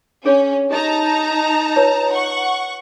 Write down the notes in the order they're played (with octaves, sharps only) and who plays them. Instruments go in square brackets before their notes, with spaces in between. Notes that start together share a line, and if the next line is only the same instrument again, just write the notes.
[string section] C#4 [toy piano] D4 G#4 C#5
[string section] D#4 A5 A#5 [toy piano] G4 D#5
[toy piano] F4 B4 C#5
[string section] F#5 C#6